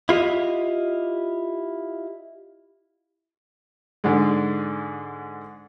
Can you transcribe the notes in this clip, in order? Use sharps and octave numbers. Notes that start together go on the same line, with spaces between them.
E4 F4 G4 D#5
G#2 D3 G#3